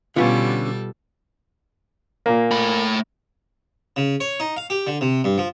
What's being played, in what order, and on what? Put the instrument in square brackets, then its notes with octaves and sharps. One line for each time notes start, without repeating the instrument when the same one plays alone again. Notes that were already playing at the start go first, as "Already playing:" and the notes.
[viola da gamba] B2 G3 A4 [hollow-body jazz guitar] D3 B3 C#4 [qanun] F4
[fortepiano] A#2 A#3
[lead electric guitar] A3 B5
[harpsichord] C#3
C#5
D#4
F5
G4
D3
C3
G2
F3